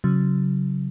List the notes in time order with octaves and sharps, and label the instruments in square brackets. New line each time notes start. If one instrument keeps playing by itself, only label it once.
[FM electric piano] C#3 F#3